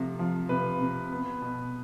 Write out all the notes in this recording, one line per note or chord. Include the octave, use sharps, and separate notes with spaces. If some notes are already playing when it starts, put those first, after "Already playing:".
Already playing: C3 F3 A3
F3
C3 B4
C3
B3
B2